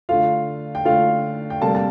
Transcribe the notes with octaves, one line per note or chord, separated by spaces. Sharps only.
D3 A3 F4 F5
G5
D3 A3 F4 F5
G5
C3 G3 A#3 A4 A5
A5